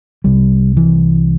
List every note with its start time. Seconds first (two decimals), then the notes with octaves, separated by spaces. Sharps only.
0.24 C2 C3 G3
0.77 E3